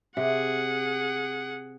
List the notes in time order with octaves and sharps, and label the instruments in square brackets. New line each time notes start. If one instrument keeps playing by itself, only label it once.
[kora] C3 [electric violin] G#4 F#5